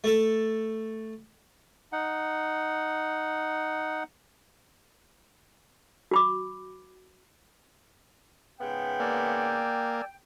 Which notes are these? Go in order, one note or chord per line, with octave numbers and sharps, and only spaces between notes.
A3 A4
D#4 F#5
F#4 B5 D6
G#2 C#3 B3 G5
A#3 D5 G#5 E6